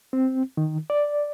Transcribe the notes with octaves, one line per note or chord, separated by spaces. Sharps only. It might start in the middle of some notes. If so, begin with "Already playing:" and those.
C4
D#3
D5